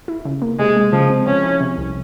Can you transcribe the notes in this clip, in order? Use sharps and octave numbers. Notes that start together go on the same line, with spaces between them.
E4
C#3
A#3
C3 G#3
G#3
C#3 F3
C4
F3 C#4
E4
C3
C2